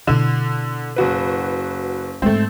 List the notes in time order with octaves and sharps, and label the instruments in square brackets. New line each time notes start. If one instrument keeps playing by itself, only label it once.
[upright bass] B2 E4 [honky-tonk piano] D3
[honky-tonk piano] F#1 F#4 B4
[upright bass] G#2 G#3 [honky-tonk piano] A3 C4